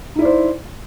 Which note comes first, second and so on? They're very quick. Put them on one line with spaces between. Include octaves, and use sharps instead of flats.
D#4 E4 D5 C5